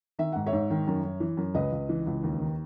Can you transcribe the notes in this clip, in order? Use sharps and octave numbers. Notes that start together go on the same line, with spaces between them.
D#3 E5
G#2 F#5
C#5 E5
G#2
D#3
F#2
F#2
E3
F#2
C#2 B4 D#5
C#2
E3
C#2
D#2
D#3